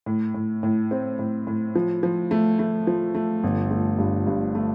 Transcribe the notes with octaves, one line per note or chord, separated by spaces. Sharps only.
A2
A2
A2
C4
A2
A2
F3
F3
A3
A3
F3
A3
G1
A3
G2
G2
A3